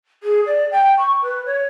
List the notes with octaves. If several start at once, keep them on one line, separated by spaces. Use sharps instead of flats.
G#4
D5
G5
C#6
B4
C#5